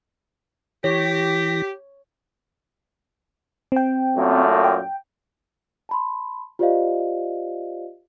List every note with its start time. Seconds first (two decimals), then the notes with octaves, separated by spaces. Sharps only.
0.84 E3 G4 C#5 A#6 B6
3.72 C4 G5
4.17 F#2 A#2 A3
4.64 G5
5.89 A5 B5 C6
6.59 F4 G4 C5 D5 D#5 F5